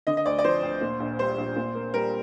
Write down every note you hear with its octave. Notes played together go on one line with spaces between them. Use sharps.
D3 D#5
D#5
D2 D5
D5
F3 C5
D2
A#2
A#1
G3 C5
A#1
A#2
A#3
G3 A#4